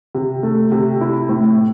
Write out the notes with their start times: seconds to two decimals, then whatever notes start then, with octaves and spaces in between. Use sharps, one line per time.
0.15 C3
0.43 A3
0.72 C3
1.01 E4
1.29 A2